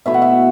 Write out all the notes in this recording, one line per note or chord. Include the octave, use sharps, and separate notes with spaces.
B2 A3 E4 E5
F#5
E5